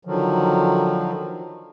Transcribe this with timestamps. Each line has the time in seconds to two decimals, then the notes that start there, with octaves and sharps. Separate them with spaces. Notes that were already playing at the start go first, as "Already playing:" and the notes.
0.05 D3 D#3 F3 F#3